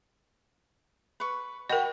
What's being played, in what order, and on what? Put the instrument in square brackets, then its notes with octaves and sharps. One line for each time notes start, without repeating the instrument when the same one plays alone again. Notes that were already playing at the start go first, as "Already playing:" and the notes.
[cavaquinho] B4 C#6
[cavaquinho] F#4 G5 B5 [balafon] A#4 D#5